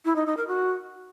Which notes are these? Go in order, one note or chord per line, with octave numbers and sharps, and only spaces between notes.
E4
D#4
D#4
A#4
F#4